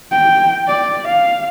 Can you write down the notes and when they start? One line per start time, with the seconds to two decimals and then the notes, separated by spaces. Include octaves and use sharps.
0.12 G5
0.68 D5
1.08 F5